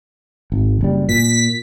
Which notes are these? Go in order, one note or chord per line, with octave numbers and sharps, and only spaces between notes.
G#1
F#1 G3
A#2 B6